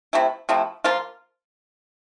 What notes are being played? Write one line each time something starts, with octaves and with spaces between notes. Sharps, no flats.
C3 F3 A3 E4
C3 F3 A3 E4
F3 A#3 F4